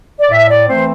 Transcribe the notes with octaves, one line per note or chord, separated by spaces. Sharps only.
D5
A2 E5
D5
E3 A3 C4 C5